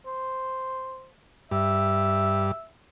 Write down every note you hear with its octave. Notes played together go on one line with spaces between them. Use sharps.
C5
G2 E5